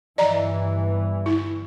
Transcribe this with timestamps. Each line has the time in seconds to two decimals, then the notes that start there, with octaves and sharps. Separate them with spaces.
0.18 G1 G2 E3 D5 D#5 A#5
1.26 E4